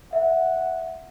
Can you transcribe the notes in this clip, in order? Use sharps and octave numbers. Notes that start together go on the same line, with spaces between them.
E5 F#5